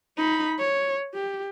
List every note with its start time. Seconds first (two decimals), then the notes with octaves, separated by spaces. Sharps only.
0.17 D#4 B5
0.59 C#5
1.14 G4